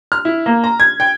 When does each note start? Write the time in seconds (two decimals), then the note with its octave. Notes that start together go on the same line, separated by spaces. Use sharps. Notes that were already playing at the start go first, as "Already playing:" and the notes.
0.12 F6
0.25 E4
0.46 A#3
0.64 A#5
0.80 G#6
1.00 G5